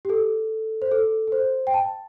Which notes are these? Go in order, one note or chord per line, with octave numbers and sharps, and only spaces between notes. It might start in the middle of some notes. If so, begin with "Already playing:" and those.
G4
A4
C5
A4
A4
C5
G5
A5